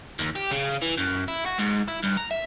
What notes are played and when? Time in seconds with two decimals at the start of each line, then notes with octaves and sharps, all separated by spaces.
0.19 D#2
0.36 G4
0.51 C#3
0.82 E3
0.98 F#2
1.28 E4
1.46 F#4
1.58 G#2
1.88 E4
2.03 G2
2.17 A#5
2.31 E5